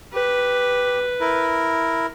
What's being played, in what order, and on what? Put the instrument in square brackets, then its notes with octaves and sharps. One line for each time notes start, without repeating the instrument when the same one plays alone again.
[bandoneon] G4 [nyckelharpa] B4
[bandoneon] E4 A#4